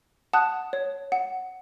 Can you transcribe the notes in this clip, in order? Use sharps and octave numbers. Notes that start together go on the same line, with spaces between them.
F#5 A5 D#6 F#6
C#5
F#5